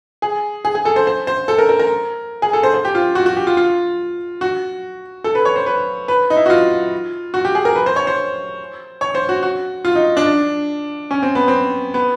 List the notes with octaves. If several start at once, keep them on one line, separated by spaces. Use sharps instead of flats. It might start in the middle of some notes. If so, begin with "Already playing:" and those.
G#4
G#4
G#4
A4
C5
C5
C5
A4
A#4
A#4
A#4
G#4
A4
C5
C5
G4
F4
F#4
F#4
G4
F4
F4
F#4
A4
B4
C#5
C5
B4
B4
D#4
E4
F#4
F4
F#4
G4
G#4
A#4
B4
C5
C#5
C5
C#5
C5
F#4
F#4
F4
D#4
D4
C#4
C4
B3
C4
B3